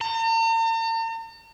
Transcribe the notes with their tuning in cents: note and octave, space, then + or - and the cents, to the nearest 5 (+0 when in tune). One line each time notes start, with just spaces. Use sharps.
A#5 -45